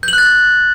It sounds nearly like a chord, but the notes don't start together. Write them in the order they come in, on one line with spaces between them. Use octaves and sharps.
G6 F#7 F#6 A6